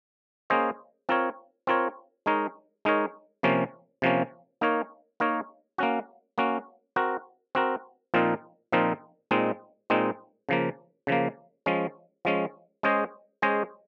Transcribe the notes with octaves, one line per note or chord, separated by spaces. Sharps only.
A#3 C#4 G#4 C5 D#5
C4 F4 A#4 C#5
C4 F4 A#4 C#5
G#3 D#4 A#4 C#5
G#3 D#4 A#4 C#5
C3 F3 A#3 C#4
C3 F3 A#3 C#4
A#3 D#4 A#4 C#5
A#3 D#4 A#4 C#5
A#3 C#4 F#4
A#3 C#4 F#4
C4 F#4 A#4
C4 F#4 A#4
A#2 F3 C4 D#4 A#4
A#2 F3 C4 D#4 A#4
A#2 G#3 C4 D#4
A#2 G#3 C4 D#4
C#3 F3 A#3
C#3 F3 A#3
F3 G#3 C#4
F3 G#3 C#4
G#3 C#4 G#4 C5 D#5
G#3 C#4 G#4 C5 D#5